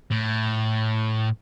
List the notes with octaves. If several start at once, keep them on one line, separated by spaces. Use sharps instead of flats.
A2